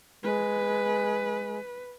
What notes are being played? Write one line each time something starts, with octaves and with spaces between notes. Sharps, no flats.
G#3 B4